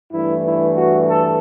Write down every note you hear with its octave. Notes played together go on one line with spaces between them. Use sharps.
G2 E3 A3 E4
E4
F#4
A4